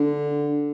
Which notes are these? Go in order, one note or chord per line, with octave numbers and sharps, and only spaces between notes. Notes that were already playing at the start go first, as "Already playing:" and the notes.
Already playing: D3